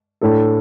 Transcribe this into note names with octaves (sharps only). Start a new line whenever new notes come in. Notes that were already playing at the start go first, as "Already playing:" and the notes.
A2 A3 D4 A4